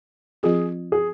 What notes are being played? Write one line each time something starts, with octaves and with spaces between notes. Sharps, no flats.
F3 C4 F4 G#4
G#4